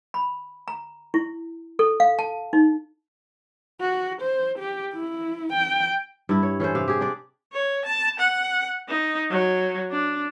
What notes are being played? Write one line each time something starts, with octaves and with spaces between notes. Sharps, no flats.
B5
A#5
E4
A4
F5
A5
D#4
F#4
C5
G4
E4
G5
G2 E4
C#5
E3 C#4 A4 C5
C3 F5
G4 G#4
D4 D5
C#5
A5
F#5
D#4
F#3
D4